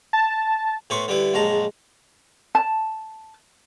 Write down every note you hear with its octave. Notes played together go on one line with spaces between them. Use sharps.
A5
A2 A3 B3 C5 C#6
D3 G3 B3 E4
A#1 F#2 G#3 A5 A#5
A5